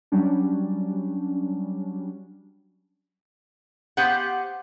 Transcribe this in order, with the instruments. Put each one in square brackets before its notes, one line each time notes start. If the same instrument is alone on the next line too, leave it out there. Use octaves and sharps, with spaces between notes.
[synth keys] F#3 G3 C#4 D4
[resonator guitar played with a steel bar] B3 G4 C5 F5 F#5